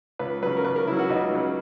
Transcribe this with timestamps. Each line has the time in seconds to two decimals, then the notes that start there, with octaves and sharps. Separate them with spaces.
0.19 C#2 B4
0.42 C#3 F#3 B4
0.57 A#4
0.64 C#2 B4
0.76 A#4
0.87 C#3 F#3 E4
0.99 F#4
1.09 C#2 D#4
1.32 C#3 F#3